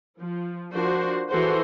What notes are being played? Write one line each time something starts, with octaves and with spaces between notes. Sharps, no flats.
F3
F3 D4 F#4 A#4 C5
E3 F#4 G#4 A4 C5 C6